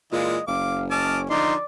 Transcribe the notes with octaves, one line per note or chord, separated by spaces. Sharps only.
A#2 E3 G#3 F4 D#5
F#1 F5 D6
C#4 D#5 A5 D6 F6
D3 F3 D#4 D5 C6